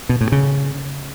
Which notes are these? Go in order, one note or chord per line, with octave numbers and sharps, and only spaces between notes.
B2
A2
C#3